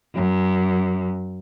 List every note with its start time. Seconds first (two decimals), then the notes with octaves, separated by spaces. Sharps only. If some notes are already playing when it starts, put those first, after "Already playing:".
0.15 F#2